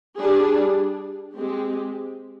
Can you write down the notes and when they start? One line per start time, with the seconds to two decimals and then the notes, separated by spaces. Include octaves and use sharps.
0.16 G3 D4 G#4
1.33 G#3 C4 G4